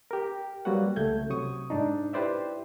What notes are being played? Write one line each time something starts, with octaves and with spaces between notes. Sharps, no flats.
G4 A#4
F#3 G3 A#3 F#4 B4 F#5
C#2 A3 G6 G#6
C3 F#3 C#6 D#6
G#2 D4 D#4
E4 G4 B4 C5 D5 E5